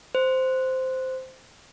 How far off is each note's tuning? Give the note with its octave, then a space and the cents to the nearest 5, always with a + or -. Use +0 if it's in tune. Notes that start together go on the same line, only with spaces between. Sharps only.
C5 -10